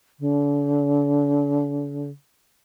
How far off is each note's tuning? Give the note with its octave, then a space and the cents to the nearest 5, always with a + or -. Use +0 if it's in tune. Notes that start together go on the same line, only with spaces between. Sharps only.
D3 -40